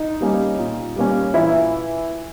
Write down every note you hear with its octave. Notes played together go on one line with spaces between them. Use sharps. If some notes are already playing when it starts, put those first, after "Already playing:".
Already playing: D#4
G3 A#3 C#4
A#2
G3 A#3 C#4
A#2 E3 E4